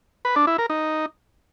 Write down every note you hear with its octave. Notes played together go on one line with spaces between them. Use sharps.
B4
D4
E4
A#4
D#4